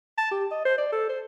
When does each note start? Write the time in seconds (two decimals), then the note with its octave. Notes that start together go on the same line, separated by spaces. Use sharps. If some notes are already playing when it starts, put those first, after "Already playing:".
0.18 A5
0.31 G4
0.51 D#5
0.65 C5
0.78 D5
0.92 A4
1.09 C5